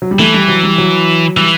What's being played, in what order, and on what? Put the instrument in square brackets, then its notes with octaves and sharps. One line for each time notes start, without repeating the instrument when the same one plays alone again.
[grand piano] F#3
G3
[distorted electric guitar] E3 [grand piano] A3
[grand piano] G3
F#3
G3
F#3
[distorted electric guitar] E3 [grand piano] G3